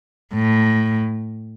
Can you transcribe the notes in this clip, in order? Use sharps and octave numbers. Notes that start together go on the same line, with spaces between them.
A2